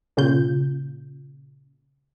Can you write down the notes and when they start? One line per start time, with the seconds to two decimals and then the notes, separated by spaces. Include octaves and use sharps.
0.17 A#2 C#3 F4 G6